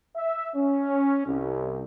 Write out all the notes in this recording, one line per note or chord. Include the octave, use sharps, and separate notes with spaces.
E5
C#4
C2